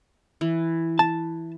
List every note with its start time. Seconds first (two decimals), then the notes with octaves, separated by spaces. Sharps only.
0.41 E3
0.99 A5